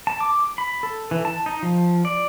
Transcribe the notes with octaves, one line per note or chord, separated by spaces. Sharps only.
A5
D6
B5
A4
E3
A5
D#4
F3
D5